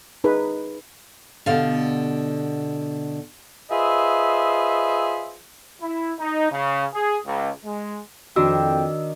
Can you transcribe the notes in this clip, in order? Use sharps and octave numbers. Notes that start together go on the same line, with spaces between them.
D#4 G#4 B4
B2 D3 G4 D5 F5
F4 G#4 B4 C5 D#5 E5
E4
D#4
C#3
G#4
C#2
G#3
F2 D#3 D4 F#4 G5 E6